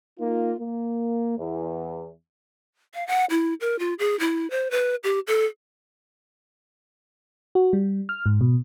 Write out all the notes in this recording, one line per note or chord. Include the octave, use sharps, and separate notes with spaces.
A#3 D#4 F4
A#3
E2
F5
F#5
E4
A#4
F4
G#4
E4
C5
B4
G4
A4
F#4
G3
F6
G#2
B2